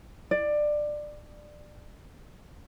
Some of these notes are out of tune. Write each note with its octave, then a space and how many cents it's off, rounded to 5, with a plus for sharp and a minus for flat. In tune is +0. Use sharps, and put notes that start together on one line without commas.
D5 +20